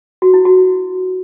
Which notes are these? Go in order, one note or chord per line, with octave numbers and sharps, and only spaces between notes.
F#4
E4
F#4